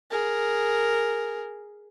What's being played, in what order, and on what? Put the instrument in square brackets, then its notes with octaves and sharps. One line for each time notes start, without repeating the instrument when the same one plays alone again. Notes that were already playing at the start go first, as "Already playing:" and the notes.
[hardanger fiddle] G#4 A#4